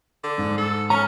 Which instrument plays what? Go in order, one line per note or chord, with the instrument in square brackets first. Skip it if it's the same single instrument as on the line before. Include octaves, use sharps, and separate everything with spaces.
[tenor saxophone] D3
[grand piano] G#2
[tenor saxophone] A4
[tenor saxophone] C#4 [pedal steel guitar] A#5 F6